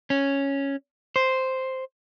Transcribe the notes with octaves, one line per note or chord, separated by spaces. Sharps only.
C#4
C5